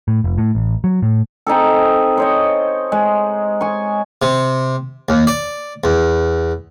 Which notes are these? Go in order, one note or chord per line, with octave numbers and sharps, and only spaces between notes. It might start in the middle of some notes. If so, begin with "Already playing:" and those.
A2
F1
A2
A1
F#3
A2
C4 D#4 G#4 A4
C5 C#5 D#5
G#3
G#5 C#6
C3
D#2
D5
E2